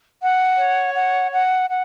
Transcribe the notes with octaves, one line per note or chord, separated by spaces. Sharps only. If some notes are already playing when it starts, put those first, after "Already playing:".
F#5
C#5
F#5
F#5
F#5